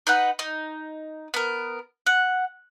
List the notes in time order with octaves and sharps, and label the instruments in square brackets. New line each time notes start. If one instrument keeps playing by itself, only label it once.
[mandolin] D#4 B4 F#5
D#4
B3 A#4
F#5